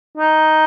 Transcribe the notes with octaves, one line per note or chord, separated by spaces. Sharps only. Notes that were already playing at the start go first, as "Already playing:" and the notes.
D#4